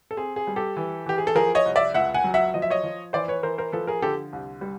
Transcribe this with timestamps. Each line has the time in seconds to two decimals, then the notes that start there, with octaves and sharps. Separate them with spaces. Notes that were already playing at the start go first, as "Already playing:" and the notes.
0.11 A4
0.17 C4 G#4
0.36 G#4
0.47 G3
0.56 G4 A4
0.76 E3
1.06 E3 G4
1.18 G#4
1.27 A4
1.35 F3 G#4 A#4
1.55 C#5 D#5
1.66 C2
1.76 D5 E5
1.94 C#2 E5 F#5
2.14 F#5 G#5
2.24 F#3
2.34 E5 F#5
2.54 F3 D#5
2.62 E5
2.70 C#5 D#5
2.84 F3
3.13 E3 C5 D5
3.28 B4 C#5
3.43 E3 A#4 C5
3.58 A#4 C5
3.72 F3 A4 B4
3.87 G#4 A#4
4.02 D3 G4 A4
4.33 C2
4.61 G3